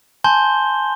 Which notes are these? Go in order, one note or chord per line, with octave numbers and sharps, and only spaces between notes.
G#5 A5 C6 G6 G7